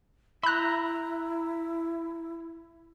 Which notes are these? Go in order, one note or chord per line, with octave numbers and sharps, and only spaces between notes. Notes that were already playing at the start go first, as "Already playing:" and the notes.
E4 E5 A#5 B5 F#6